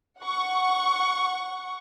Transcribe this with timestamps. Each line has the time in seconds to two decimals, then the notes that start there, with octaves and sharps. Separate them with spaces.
0.21 F#5 C#6